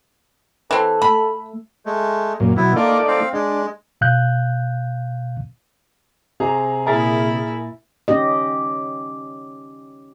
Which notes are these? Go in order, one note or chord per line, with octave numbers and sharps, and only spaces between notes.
E3 C4 A4
A3 B5
G#3 A3
F#2 A#2
B2 F#3 B3 E4
A3 A#3 D#4 F4 D5
C4 F5
G#3 D4
B2 F5 F#6 G6
C3 G#4 C5 A#5
A#2 E4 G#4 A#4 E5 G#5 A#5 A6
C#4 D#4 G4 D#5